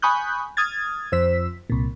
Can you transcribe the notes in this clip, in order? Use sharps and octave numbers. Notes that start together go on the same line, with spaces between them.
G#5 B5 C#6 D#6 F#6 G6
D#6 F6 G#6 A6
F2 C5 E6 B6
C2 A#2